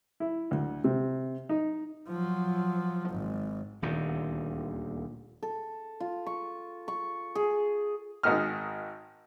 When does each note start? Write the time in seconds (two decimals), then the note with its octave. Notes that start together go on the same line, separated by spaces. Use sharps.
0.20 E4
0.51 D2
0.84 C3
1.49 D#4
2.08 F3 F#3
3.10 G#1
3.82 D#1 D2 D#3
5.42 A4
6.00 F4
6.26 C#6
6.88 C#6
7.35 G#4
8.23 G#1 G#2 D#3 D#5 F6